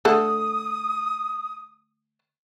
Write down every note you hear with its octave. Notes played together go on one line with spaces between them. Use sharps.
D3 A3 A4 D#6